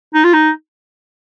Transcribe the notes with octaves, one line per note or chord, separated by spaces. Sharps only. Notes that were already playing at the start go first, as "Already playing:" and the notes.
D#4
F4
D#4